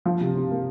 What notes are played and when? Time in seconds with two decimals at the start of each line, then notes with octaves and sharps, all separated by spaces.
0.06 F3
0.21 C3
0.35 C3
0.50 A#3